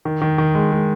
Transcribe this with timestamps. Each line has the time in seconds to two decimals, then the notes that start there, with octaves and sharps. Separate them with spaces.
0.05 D#3
0.22 D#3
0.38 D#3
0.55 G#3
0.72 G#3